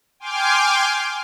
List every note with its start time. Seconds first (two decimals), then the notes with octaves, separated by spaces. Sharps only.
0.20 G5 G#5 C6 D6 F6 G6